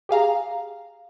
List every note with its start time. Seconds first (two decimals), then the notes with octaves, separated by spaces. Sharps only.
0.09 G4 G#4 F5 A#5